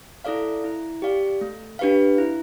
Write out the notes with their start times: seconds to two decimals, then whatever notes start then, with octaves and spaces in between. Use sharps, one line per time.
0.24 E4 A4 D5 F5
0.64 E4
1.02 G4 D5 F5
1.41 A3
1.79 D4 G4 B4 F5
2.18 E4